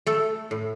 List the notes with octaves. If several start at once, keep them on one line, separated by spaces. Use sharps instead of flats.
A3 A4
A2